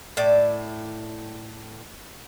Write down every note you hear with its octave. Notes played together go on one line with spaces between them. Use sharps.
A2 D5 E5